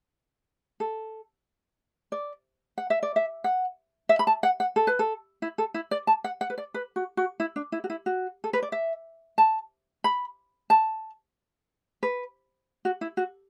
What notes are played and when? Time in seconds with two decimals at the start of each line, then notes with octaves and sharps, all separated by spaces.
0.80 A4
2.12 D5
2.78 F#5
2.90 E5
3.03 D5
3.16 E5
3.44 F#5
4.09 E5
4.19 B5
4.27 A5
4.43 F#5
4.60 F#5
4.76 A4
4.87 B4
4.99 A4
5.42 E4
5.58 A4
5.74 E4
5.91 D5
6.07 A5
6.24 F#5
6.41 F#5
6.50 B4
6.58 D5
6.74 B4
6.96 F#4
7.17 F#4
7.40 E4
7.56 D4
7.72 E4
7.84 F#4
7.90 E4
8.06 F#4
8.44 A4
8.53 B4
8.62 D5
8.72 E5
9.38 A5
10.04 B5
10.70 A5
12.03 B4
12.85 F#4
13.01 E4
13.17 F#4